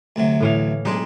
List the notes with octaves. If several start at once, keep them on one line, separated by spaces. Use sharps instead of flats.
D2 C3 F#3
A2 E3 F5
B1 G#3 D4 D#4 G4